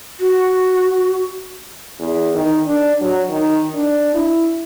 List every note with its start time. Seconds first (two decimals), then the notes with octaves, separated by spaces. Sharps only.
0.20 F#4
2.00 E2
2.35 D#3
2.67 D4
3.01 F#3
3.30 D#3
3.74 D4
4.14 E4